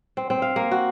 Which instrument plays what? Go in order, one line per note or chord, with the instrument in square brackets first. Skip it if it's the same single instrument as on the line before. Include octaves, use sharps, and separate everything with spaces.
[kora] C4
C4
F5
A#3
F#4